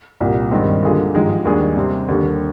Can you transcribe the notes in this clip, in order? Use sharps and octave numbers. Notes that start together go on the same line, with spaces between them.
C2 A#2 G3
G2 D#3 G#3 C4
D3 G3 A#3 F4 G#4
G#2 F3 G#3 D#4 G4
D#2 D#3 G3 D4 G#4
C3 G3 C4
D#2 D3 G3